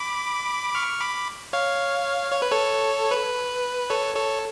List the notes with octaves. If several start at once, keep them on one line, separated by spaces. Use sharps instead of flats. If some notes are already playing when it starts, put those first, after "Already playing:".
Already playing: B5 D6
C#6 F6
B5 D6
C#5 F5
C#5
B4
A4 C#5
B4
A4 C#5
A4 C#5